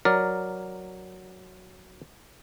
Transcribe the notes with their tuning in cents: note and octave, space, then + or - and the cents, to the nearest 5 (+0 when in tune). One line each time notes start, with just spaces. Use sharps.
F#3 +0 A#4 +0 D5 +0